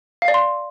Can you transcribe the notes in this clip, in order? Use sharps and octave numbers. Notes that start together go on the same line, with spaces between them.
F5
D5
C6